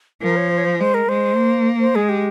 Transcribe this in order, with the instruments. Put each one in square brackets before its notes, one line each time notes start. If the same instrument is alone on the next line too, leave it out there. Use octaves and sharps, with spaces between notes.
[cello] F3 [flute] A#4
[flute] C#5
C5
C#5
C5
[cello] G#3 [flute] C5
[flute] A#4
[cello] G#3 [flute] C5
[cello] A#3
[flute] C5
[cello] G#3 [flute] G#4
[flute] G4